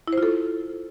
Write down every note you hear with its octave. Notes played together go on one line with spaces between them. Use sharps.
E4
C5
F4
A4